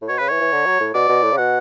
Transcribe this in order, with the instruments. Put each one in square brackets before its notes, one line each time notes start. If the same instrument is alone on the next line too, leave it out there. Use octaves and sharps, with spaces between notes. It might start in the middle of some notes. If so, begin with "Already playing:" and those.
[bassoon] A2
[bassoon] B2 [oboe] C#5
[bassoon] C#3 [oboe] B4
[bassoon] E3 [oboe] C#5
[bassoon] E3
D3
F#3
A2
[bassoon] B2 [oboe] D5
[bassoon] B2
A2
C#3
[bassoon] B2 [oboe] F#5